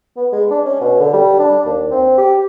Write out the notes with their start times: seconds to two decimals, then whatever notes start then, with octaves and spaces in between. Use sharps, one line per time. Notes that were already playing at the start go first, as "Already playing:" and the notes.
0.17 B3
0.33 G#3
0.51 D4
0.66 C#4
0.81 B2
1.00 D3
1.14 G3
1.39 D4
1.66 D#2
1.91 C4
2.18 G4